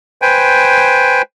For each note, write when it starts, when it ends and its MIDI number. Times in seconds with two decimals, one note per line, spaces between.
0.22 1.22 71
0.22 1.22 72
0.22 1.22 79
0.22 1.22 80